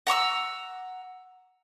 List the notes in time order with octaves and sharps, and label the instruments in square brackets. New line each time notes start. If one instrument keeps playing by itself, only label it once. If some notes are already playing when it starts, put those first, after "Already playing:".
[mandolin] F#5 A#5 C#6 E6